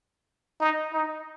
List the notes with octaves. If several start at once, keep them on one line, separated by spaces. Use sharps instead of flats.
D#4
D#4